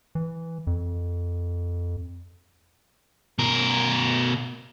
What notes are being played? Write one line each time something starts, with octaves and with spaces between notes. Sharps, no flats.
E3
F2
B2 A#4